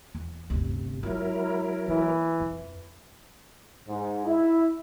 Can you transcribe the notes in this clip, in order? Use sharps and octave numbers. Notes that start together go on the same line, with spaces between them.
E2 E3
G1 D2 C3
F#3 G#3 E4 F4 A#4
E3 A#3
F2
G#2
E4